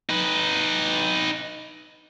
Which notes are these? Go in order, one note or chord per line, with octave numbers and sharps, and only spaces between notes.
D#4 B4